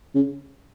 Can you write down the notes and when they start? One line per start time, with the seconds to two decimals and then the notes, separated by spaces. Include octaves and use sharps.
0.15 C#3